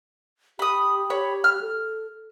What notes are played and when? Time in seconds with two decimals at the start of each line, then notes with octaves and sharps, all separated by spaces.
0.59 G4 B5 D#6
1.10 C#5 B5
1.44 F6
1.61 A4